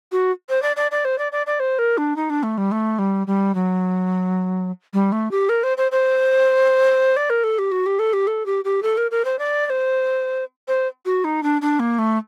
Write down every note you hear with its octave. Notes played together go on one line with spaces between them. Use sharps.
F#4
C5
D5
D5
D5
C5
D5
D5
D5
C5
A#4
D4
D#4
D4
A3
G3
A3
G3
G3
F#3
G3
A3
G4
A#4
C5
C5
C5
D5
A#4
A4
G4
F#4
G4
A4
G4
A4
G4
G4
A4
A#4
A#4
C5
D5
D5
C5
C5
F#4
D#4
D4
D4
A#3
A3